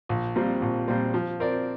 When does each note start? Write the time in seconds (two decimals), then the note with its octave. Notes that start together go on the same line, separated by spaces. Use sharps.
0.09 A#1
0.36 A#2 G3 C4
0.62 A#1
0.88 A#2 G3 C4
1.14 F3
1.40 C4 A#4 D5